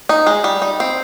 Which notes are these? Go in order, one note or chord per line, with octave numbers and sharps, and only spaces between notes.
D#4
G#3
G3
D#4
C4